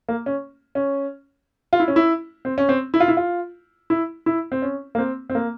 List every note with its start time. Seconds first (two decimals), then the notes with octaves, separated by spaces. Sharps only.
0.08 A#3
0.26 C#4
0.75 C#4
1.73 F4
1.80 E4
1.88 C#4
1.96 E4
2.45 C4
2.58 C#4
2.69 C4
2.94 E4
3.00 F4
3.08 E4
3.17 F4
3.90 E4
4.26 E4
4.52 C4
4.62 C#4
4.95 A#3
4.98 C4
5.30 C4
5.35 A#3